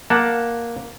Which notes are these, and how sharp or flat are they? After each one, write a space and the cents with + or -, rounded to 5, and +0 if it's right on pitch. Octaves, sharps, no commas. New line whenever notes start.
A#3 +5 F#5 +0 A5 +5